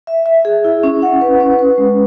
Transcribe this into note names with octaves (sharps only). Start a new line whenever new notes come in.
E5
E5
G#4
E4
C#4
F#5
B4
C#4
B4
G#3